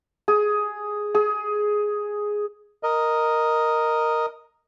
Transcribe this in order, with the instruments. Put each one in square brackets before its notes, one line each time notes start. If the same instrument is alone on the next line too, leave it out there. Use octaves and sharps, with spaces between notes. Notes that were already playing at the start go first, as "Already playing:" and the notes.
[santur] G#4
G#4
[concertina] A#4 D#5